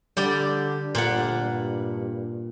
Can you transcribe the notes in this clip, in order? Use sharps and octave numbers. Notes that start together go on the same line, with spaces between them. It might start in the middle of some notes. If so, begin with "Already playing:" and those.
D3 G3 G4 D5
G1 A#2 F#5
G2